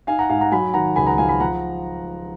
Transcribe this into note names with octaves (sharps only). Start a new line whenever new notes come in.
D#4 F5 G#5
F#5 A#5
G#2 F5 G#5
F#5 A#5
F#3 G#5 B5
D#3 F#5 A#5
C#2 G#5 B5
F#5 A#5
F3 F5 G#5
G#5 B5
F3 F#5 A#5